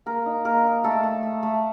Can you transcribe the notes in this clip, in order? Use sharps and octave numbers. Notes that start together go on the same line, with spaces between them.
A#3 A#4
D#4
A#3 A#4
D#4
A3 A4
A3
A3
A3